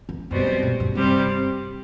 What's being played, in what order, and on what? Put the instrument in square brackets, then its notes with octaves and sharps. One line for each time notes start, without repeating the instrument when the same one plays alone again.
[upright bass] E2
[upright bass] F#2 [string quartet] B2 G3 C4
[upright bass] F#2
B2
G2
[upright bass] G2 [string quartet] C3 G3 C4 G4